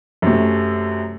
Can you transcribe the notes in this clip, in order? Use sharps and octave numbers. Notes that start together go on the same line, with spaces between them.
F#2 C3 A3